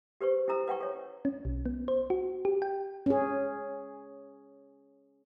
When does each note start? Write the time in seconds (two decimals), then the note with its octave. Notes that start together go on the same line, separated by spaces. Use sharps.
0.21 G4 B4 C5 C#6
0.48 C#4 E4 A4 A#5 E6
0.68 B4 F#5 G5 C#6
0.80 A4 C#5
1.25 C#4
1.45 B1
1.66 B3
1.88 C5
2.10 F#4
2.45 G4
2.62 G5
3.06 C#4 G#4